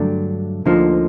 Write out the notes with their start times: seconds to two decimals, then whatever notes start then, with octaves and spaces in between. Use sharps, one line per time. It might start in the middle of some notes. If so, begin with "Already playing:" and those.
Already playing: G2 D3 F#3 A3 D4
0.65 D2 D3 F3 A#3 D#4